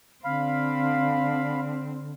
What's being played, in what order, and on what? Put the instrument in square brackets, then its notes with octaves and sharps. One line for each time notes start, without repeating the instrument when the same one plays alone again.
[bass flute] D3 [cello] C4 [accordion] F5 B5